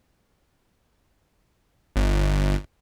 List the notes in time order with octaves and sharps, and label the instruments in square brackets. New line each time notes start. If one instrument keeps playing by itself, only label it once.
[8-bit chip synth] G1